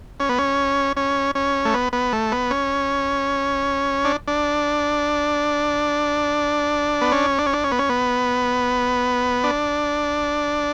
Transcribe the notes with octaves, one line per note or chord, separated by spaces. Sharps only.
C#4
B3
C#4
C#4
C#4
A3
B3
B3
A3
B3
C#4
D4
D4
B3
C#4
D4
C#4
D4
C#4
B3
C#4
B3
D4